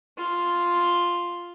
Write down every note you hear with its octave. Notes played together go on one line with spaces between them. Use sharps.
F4